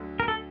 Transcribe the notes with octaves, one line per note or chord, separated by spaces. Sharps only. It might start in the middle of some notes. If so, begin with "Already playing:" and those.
Already playing: D2 D3 F#3
A#4
A4